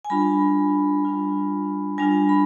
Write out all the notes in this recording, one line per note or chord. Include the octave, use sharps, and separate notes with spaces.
G#5
G3 D4 F4 B5
G3 D4 F4
G3 D4 F4 G#5
B5